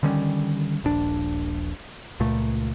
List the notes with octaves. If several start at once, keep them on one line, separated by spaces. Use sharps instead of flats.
D3 D#3 G3 C#4
D#1 A#1 D4
C#2 A#2 A3